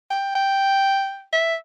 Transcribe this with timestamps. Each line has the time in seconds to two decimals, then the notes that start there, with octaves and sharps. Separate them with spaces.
0.11 G5
0.35 G5
1.33 E5